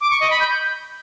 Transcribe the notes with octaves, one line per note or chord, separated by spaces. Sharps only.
D6
C#6
D#5
B5
G6